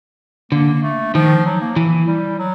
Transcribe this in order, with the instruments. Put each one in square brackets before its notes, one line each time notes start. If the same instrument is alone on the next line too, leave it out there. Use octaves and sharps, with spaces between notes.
[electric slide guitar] D3 [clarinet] A#3
[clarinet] A3
[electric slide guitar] D#3 [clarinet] F3
[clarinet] F#3
A#3
[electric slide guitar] E3
[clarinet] G3
F#3